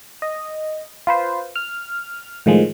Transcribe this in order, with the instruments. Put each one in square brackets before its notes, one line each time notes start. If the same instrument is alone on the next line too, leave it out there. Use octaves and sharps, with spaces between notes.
[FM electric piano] D#5
F4 B4 C5
F6
A2 D#3 F3 G#3